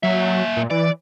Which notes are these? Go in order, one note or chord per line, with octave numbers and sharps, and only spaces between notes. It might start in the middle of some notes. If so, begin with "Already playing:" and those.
F#3 A#3 E5
A#2
E3 D5